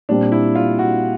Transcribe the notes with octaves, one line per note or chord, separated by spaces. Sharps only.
A#2 G3 C4 D4
E4
F4
F#4